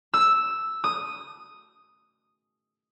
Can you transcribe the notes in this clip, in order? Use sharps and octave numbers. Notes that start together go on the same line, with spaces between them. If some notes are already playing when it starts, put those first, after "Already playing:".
E6
D#6